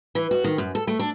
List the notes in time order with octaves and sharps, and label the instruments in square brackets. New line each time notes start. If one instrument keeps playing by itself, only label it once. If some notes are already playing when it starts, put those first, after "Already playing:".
[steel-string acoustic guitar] E3
F#4
D#3
F#2
A4
A3
D4